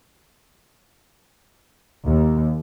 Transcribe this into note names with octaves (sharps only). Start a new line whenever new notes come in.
D#2